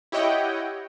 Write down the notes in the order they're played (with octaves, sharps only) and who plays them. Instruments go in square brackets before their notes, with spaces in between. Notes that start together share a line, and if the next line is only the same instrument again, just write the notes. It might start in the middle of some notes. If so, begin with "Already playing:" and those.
[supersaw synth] E4 G4 C#5 D#5 F#5 G5